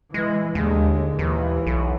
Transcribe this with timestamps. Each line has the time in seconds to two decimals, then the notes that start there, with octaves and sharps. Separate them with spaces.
0.14 E3 G#3
0.55 D#2 D3 G#3
1.19 D#2 E3
1.67 B1